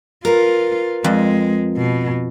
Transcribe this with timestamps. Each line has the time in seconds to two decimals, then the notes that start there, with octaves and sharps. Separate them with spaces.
0.25 F4 A#4 B4
1.04 F2 G#3
1.77 B2